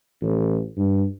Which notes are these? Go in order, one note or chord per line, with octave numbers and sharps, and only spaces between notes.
A1
G2